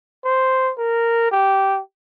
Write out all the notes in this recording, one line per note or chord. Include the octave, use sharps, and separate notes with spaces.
C5
A#4
G4